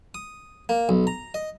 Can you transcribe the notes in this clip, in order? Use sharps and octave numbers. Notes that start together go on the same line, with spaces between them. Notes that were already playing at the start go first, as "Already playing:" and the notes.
D#6
A#3
B1
A#5
D#5